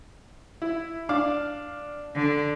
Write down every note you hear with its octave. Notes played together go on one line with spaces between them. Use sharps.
E4
D4 F5 D6
D3